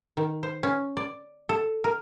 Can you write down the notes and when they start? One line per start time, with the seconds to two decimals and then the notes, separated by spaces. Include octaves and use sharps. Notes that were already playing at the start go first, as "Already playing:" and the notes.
0.17 D#3
0.43 C5
0.63 C#4
0.97 D5
1.49 A4
1.84 A#4